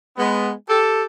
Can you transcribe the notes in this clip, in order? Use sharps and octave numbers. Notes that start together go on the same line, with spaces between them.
G#3 B3
G4 A4